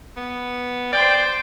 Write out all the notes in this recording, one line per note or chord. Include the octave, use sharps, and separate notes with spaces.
B3
C5 D5 G5